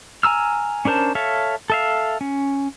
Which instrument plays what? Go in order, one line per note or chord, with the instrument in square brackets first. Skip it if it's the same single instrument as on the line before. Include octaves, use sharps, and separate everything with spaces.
[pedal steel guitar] G#5 A#5 E6 F6
C#4 D4 A#4 C5 A5
A4 C#5 E5 F5
A4 E5 F5
C#4